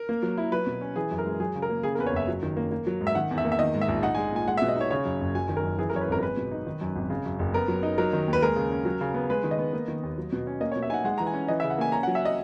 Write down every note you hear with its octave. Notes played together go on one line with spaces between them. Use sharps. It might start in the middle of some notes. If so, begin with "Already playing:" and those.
Already playing: A#4
A#3
F#3
E4
F#3 B4
B2
C#4
E3 G#4
F#2
A#4
G#3
F#3 G#4
C#3
A#4
A#3
C#3 G#4
A#4
E2 B4
C#5
F#1 E5
F#3
D#3
A#3
A#3
F#3
G#2
E5
D#3 F#5
E2
E5
A#3
E5
D#3 D#5
G#2
E5
A#1
D#4 F#5
G#5
G#3
A#2 G#5
G#3 F#5
E5
B2
D#5
D#4 C#5
C#3 C#5
F#2
F#1
F#3 G#5
D#3
A#4
F#2
E3 G#4
A#4
F#2 C#5
B4
G#1 A#4
A#4
G#3 B4
B2
D#4
D#3
F#2
G#1
C#3
F#2
F#1
B3 A#4
F#3
D#4
F#3 A#4
D#3
D#2
B4
G#3 A#4
C#3
C#4
F#3
C#3
B3
G#3 B4
D#3
D#5
B3
A#3
D#3
D#2
F#3
B2
C#4
A#3 D#5
C#5
B2
E5
D#4 F#5 G#5
G#3 F#5
E3 A#5
G#5
C#4
E3 D#5
E5
C#3
F#5
A#3 G#5
C#4 A#5
F#5
F#3
E5
D#5